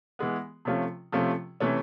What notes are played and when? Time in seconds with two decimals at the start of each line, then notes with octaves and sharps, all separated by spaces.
0.19 E3 G#3 B3
0.65 C3 F3 A3 C#4 F4
1.12 C3 F3 A3 C#4 F4
1.60 C3 E3 A3 C#4